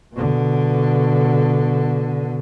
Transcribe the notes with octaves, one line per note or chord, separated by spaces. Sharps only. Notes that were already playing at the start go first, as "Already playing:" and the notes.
B2 D3